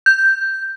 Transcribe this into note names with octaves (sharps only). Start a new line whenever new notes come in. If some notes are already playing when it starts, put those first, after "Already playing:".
G6